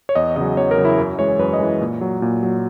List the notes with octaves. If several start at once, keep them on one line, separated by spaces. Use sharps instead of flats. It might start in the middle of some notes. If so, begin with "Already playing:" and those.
C#5
E2 D#5
C#3 F#3 D#5
E2 C#5
A#4
C#3 F#3
E4
F#2
E3 G#3 C#5
F#2 B4
D#5
E3 G#3
A#2
F#3
A#2
F#3